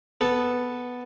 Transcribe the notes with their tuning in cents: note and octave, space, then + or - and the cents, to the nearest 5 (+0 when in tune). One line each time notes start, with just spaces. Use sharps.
B3 +0 A4 -5